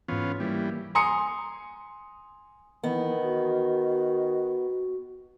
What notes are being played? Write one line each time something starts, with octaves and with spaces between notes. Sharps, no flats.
G#2 E3 B3 C#4 F4
E3 G3 A#3
G#5 A#5 C6 D#6 C#7
D#3 E3 B3
F#4